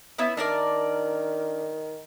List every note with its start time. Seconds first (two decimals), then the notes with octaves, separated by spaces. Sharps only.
0.18 B3 C#4 E4
0.37 D#3 D4 A#4 D5